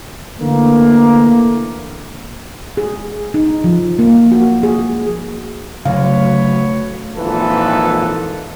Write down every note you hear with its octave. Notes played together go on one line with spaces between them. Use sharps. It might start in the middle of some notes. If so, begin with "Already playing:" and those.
D3 E3 A3 A#3
G#4
D#4
F3
A#3
F#4
G#4
D2 C#3 F#3 F#4 B4 C#5 F5
G#1 A#2 E3 F3 A4 B4